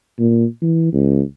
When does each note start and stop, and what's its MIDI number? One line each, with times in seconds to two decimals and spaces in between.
0.19 0.45 46
0.62 0.92 52
0.93 1.21 37